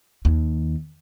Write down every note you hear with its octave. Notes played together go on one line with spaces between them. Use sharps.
D#2